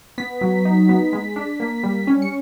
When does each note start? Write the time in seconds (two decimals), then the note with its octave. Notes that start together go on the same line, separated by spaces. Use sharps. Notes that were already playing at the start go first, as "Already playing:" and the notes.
0.18 B3 B6
0.41 F#3
0.65 D#4
0.89 B3
1.13 G#3
1.36 D4
1.60 A#3
1.83 G3
2.07 C#4
2.22 C#7